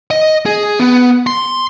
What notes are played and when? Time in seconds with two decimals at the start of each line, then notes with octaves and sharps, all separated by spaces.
0.11 D#5
0.46 G#4
0.80 B3
1.27 C6